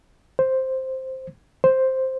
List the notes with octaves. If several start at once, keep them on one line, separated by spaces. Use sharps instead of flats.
C5
C5